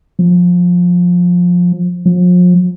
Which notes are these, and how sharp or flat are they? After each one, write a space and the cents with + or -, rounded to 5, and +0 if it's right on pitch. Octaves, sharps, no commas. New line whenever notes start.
F3 +20
F3 +40